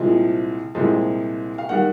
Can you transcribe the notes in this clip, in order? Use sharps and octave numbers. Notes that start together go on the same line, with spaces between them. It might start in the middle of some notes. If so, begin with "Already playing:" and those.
Already playing: C2 A#2 F3 G#3
C2 A#2 F3 G#3
F5
D#3 G3 F#5